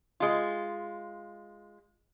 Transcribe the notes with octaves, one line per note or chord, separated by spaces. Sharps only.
G#3 F4